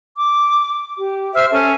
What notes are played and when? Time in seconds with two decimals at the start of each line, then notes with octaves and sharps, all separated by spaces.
0.17 D6
0.98 G4
1.34 C5 E5 E6 F6
1.51 C#4 A4 G#5